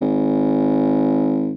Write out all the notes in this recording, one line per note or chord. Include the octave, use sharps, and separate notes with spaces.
G#1